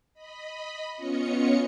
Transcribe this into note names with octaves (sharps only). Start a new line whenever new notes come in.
D#5 B5
B3 C#4 F4 C#5 D#5 C#7